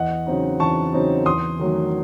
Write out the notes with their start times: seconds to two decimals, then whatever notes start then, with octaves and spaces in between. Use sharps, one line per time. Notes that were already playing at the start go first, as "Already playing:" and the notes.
Already playing: E2 D#5 F#5
0.27 C#3 F#3 C4 D#4
0.60 E2 A5 C#6
0.93 C#3 F#3 C4 D#4
1.26 E2 C6 D#6
1.59 D#3 F#3 A3